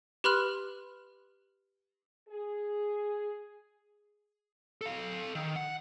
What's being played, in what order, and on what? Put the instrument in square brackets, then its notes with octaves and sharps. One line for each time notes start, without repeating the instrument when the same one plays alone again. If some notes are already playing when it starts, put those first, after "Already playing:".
[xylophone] G4 B4 B5 C6 F6 F#6
[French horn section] G#4
[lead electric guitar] A4 F5
D#3
F#5